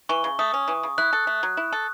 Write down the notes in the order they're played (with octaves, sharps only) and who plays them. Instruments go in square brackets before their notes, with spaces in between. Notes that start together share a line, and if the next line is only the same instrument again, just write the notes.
[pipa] E3 [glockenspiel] C#6
[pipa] C#3
[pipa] A3 [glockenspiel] D#6
[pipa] C#4
E3
C#3
[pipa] E4 [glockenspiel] F#6
[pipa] A4
A3
F#3
E4
A4